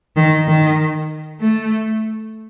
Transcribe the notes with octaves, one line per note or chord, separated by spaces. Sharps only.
D#3
D#3
A3